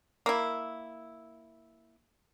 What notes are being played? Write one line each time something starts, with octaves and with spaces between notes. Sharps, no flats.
A#3 E4